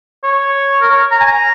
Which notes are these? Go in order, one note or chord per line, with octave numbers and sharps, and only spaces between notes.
C#5
A#4
C#5
A#5
G#5
A#5